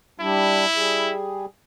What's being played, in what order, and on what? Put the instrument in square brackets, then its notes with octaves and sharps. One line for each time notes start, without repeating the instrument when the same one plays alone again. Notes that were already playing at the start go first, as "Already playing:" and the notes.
[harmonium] G3 D4 [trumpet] E4
[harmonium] G3 G#4